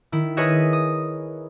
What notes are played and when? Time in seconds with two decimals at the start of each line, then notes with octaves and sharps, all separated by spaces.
0.12 D#3 E4
0.37 G#4 A#4 B4 C#5 D#5 E5
0.73 D#6